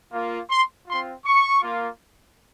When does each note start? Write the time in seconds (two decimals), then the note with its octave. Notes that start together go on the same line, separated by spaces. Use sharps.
0.13 A#3 F4
0.50 C6
0.87 C4 F4 C6
1.24 C#6
1.62 A#3 F4